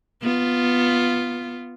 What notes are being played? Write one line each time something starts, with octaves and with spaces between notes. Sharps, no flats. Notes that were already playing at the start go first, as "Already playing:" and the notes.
B3 F4